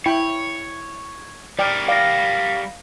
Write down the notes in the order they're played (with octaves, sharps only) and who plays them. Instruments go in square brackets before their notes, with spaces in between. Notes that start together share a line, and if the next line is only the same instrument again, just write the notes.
[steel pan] E4 G5 B5 [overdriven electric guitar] C#5
[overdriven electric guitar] G3 A#4 [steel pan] D5 G5
[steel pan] D5 [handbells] F5 A#6